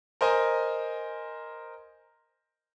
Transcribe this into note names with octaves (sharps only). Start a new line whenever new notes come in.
A#4 C5 D#5 G#5